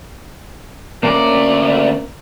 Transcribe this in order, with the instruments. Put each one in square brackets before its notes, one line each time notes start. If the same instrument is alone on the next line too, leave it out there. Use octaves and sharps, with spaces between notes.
[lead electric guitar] D2 D5 [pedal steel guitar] A#3 C#4 A#5